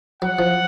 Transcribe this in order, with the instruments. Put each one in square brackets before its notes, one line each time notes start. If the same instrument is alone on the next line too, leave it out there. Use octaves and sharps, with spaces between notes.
[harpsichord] F#3 [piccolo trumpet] F#5
[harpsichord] F3